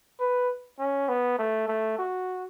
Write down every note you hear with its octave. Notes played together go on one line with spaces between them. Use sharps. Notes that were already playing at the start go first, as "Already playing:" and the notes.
B4
C#4
B3
A3
A3
F#4